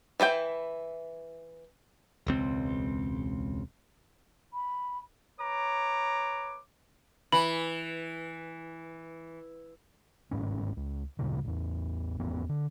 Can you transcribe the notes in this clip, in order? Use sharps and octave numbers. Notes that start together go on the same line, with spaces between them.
E3 E4 G#4 G5
E1 C#2 C4
B5
B4 C#5 A#5 D6
E3 B5
G1 G#2 C#4
C#2
D2 G2 A#2 C#3
A1 E2
G#1 E2 B3
D3